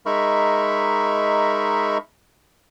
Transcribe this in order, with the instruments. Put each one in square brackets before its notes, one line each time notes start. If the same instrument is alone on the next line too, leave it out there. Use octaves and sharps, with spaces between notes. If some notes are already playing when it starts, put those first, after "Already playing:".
[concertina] G#3 D#4 A#4 E5 B5 C#6